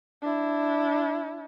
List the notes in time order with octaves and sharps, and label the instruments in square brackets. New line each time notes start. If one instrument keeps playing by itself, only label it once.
[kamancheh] D4 E4